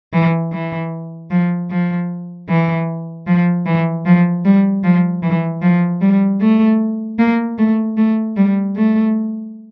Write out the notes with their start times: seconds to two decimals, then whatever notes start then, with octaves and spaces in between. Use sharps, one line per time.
0.13 E3
0.52 E3
1.31 F3
1.70 F3
2.49 E3
3.27 F3
3.66 E3
4.06 F3
4.45 G3
4.84 F3
5.23 E3
5.62 F3
6.01 G3
6.41 A3
7.19 A#3
7.58 A3
7.97 A3
8.37 G3
8.76 A3